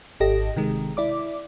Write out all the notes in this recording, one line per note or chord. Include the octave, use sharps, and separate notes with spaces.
G#1 G4 A4 D#5 A#6
C3 D#3 G#3
E4 D5 D6